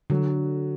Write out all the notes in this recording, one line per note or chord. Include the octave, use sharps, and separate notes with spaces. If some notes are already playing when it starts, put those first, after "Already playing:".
D3 F#3